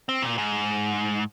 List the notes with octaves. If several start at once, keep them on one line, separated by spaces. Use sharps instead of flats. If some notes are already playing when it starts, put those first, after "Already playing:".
C4
A#2
G#2